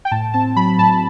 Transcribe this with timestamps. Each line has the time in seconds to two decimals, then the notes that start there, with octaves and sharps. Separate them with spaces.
0.05 G5
0.12 A2 A5
0.34 C4 A5
0.56 F#3 B5
0.78 A2 A5